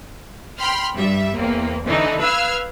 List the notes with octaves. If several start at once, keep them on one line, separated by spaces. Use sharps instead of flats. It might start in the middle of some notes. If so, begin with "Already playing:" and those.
G5 B5 C6 F6
G2 G3 E5
E2 A#3 C4
D3 E3 A3 D#4
B4 F5 E6 F6 G#6